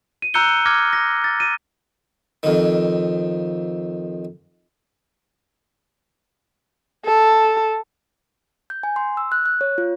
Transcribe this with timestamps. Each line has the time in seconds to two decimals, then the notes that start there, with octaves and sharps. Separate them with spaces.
0.22 D#7
0.34 A#5 E6 F#6 G6 C#7 G7
0.66 D6 F6 G#6 A#6
0.93 A#6
1.24 A6
1.40 D#7
2.43 F2 D#3
7.06 A4
8.70 G6
8.83 G#5
8.96 C6
9.17 E6
9.32 F#6
9.46 F#6
9.61 C#5
9.78 F4